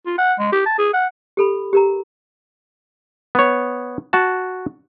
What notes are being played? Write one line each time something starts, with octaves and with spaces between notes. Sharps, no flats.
F4
F#5
G#3
G4
A5
G#4
F#5
G4 A4 B5
G4 A#4 A#5
B3 C#5
F#4 A5